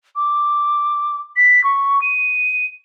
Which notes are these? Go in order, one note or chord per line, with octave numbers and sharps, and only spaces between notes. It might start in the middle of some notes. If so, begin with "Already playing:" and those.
D6
B6
C#6
D#7